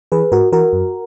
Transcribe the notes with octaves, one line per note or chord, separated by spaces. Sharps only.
E3 G#4 B4
G#2 F#4 A#4
E3 F#4 A#4
F#2